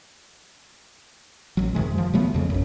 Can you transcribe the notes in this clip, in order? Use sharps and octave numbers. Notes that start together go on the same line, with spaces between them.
A1 F#3
F#2 C3 D#3 G#3
F3
C3 F#3 A3 B3
F2 C#3
G#1 F#2